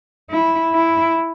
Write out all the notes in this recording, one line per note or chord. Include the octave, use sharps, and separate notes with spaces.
E4
E4